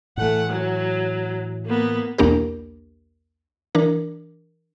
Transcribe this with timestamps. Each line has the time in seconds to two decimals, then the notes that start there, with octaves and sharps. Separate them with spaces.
0.17 A2 E3 A3 F#5
0.50 F#3
1.66 A#3 B3
2.18 B1 E2 A#3 D4 G4 A#4
3.75 E3 D4 A#4